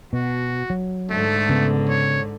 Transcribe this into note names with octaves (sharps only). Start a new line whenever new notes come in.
B2 F#4
F#3
G#2 D3 A3
C#3 B3
C#5